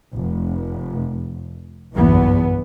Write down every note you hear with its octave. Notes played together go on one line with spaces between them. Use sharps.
F1
F#1 B1 E2 G2 E3 B3